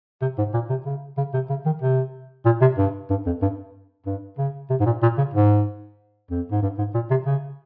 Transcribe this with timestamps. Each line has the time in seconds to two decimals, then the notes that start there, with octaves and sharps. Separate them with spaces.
0.22 C3
0.38 G#2
0.54 A#2
0.70 C3
0.85 C#3
1.18 C#3
1.34 C3
1.49 C#3
1.65 D#3
1.82 C3
2.45 A#2
2.61 C3
2.78 G2
3.10 G2
3.26 F2
3.42 G2
4.06 G2
4.38 C#3
4.70 C3
4.80 G#2
4.86 A#2
5.02 A#2
5.18 C#3
5.34 G#2
6.31 F2
6.51 G#2
6.62 G2
6.78 G#2
6.94 A#2
7.10 C3
7.26 C#3